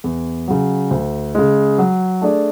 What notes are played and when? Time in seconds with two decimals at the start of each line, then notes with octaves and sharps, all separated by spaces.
0.04 E2
0.48 C#3 F#3
0.91 D2
1.35 C#3 G#3
1.78 F#3
2.21 A3 D4 G#4 D5